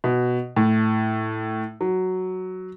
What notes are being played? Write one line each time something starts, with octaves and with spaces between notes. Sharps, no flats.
B2
A2
F#3